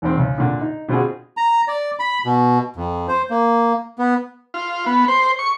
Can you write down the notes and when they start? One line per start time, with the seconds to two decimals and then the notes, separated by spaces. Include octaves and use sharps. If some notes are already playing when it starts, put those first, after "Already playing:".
0.02 G#1 E2 C4
0.17 C#2
0.38 A#2 D3
0.61 D#4
0.88 B2 D3 C4 F4 F#4 G#4
1.37 A#5
1.68 D5
1.99 B5
2.25 B2
2.76 F2
3.08 C5
3.30 A#3
3.99 B3
4.54 F4
4.86 B3
5.08 C5
5.39 C#6